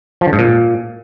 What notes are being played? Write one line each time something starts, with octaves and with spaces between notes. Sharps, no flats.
F3
D3
G#2
A#2